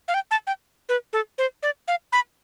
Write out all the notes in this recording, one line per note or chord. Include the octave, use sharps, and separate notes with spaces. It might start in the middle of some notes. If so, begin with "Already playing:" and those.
F5
G5
A5
G5
B4
A4
C5
D5
F5
B5